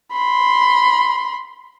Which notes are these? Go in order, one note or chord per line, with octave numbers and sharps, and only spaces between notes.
B5 C6